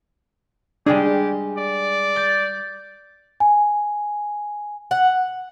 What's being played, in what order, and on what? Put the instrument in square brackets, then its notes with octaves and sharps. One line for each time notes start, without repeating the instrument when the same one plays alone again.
[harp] G3 G#3 G#4 [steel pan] D4 [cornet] G4
[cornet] D5
[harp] G6 A6
[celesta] G#5
[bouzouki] F#5